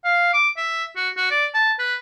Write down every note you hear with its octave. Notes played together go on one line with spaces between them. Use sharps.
F5
D6
E5
F#4
F#4
D5
A5
B4